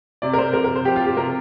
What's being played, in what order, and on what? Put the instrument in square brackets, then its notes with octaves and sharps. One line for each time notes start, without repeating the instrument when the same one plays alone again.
[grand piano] C3 D5
A#4
C3 C5
F3 A#4
A#4
C3
C5
F3 G4
F4
F3 G4
C3 A#4